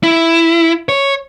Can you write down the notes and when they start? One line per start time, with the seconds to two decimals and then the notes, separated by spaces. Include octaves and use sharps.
0.03 E4
0.89 C#5